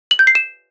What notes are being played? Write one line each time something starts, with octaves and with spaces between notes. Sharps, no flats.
F#7
G6
C7
E7